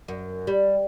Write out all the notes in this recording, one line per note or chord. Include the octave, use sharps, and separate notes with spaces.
F#2
G3